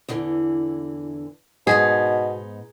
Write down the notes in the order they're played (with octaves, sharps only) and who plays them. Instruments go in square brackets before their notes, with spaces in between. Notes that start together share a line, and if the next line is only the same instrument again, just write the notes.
[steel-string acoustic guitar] E2 D3 E3
[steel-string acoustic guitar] G#2 B3 D#4 [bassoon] B2 [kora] G#4